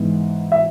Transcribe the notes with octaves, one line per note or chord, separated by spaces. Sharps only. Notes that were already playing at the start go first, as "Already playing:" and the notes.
Already playing: G#2 E3 B3
E5